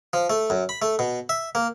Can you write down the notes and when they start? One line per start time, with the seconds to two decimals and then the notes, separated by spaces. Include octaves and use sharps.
0.13 F3
0.30 A3
0.50 F#2
0.69 B5
0.82 A3
0.99 B2
1.29 E5
1.55 A#3